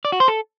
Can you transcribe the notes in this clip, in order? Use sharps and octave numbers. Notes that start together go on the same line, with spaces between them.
D5
F#4
C5
A4